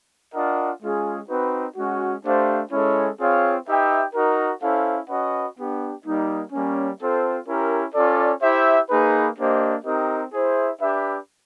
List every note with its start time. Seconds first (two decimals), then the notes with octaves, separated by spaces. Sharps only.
0.33 D4 F4 A#4 D#5 F#5
0.81 G#3 C#4 F4 G#4
1.28 C4 D#4 F#4 B4
1.76 G#3 C#4 F#4
2.23 A3 D4 G4 C5 F5
2.71 G#3 C#4 E4 A4 C#5
3.19 C4 F4 G#4 C#5 F5
3.66 D#4 G4 B4 E5 G5
4.14 D#4 F#4 A#4
4.61 C#4 E4 A4 C5 F5
5.09 C#4 F#4 B4 D#5 F#5
5.56 B3 D4 G4
6.04 G3 A#3 D#4
6.52 G3 A#3 C#4
6.99 C4 F4 A4 C5
7.47 C#4 E4 G4 A#4
7.94 C#4 F4 A4 D5
8.42 E4 G4 C5 E5
8.90 A#3 D#4 G#4 B4
9.37 A#3 D4 G4 C5 D#5
9.84 C4 D#4 G4 A#4 D#5
10.32 E4 G#4 C5 E5
10.80 D4 G4 B4 E5